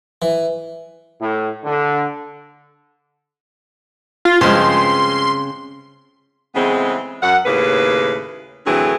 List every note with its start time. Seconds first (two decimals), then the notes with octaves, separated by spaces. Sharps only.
0.22 E3
1.21 A2
1.64 D3
4.25 F4
4.41 G2 C#3 F3 G#3 C4 C6
6.55 C#3 E3 G#3 A3 B3 C4
7.23 F#2 F#5
7.46 D#2 A2 C#3 A#3 B4
8.66 A2 D3 E3 F#3 C4 G#4